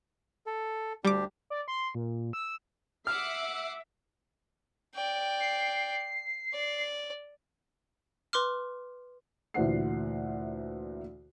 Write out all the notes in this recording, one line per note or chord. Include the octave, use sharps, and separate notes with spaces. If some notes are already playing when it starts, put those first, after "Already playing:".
A4
D2 G3 D4 G4 D6
D5
C6
A#2
E6
E5 F#5 D6 F6 C7
D5 G5
C7
D5
B4 C6 D6 F6
D2 A#2 E3 C5 F#5 C7